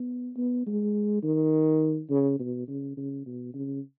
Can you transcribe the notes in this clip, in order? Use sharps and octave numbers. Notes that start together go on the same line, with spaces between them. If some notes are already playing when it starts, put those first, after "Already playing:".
Already playing: B3
B3
G#3
D#3
C#3
B2
C#3
C#3
B2
C#3